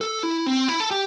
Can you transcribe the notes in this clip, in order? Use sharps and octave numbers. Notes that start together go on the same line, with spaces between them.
A4
E4
C4
E4
A4
G4